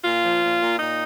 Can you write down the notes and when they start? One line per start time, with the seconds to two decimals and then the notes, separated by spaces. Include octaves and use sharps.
0.03 A#2 F4
0.22 F3
0.42 A#2
0.61 A#2
0.79 A#2 D#4